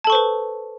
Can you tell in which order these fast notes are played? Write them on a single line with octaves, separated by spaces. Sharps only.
A5 A4 C#6 C5 B4